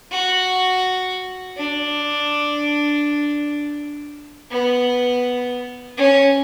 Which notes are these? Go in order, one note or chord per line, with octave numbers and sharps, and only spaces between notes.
F#4
D4
B3
C#4